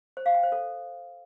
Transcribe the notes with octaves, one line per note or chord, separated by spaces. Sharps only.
C5
F5
G5
C5
A4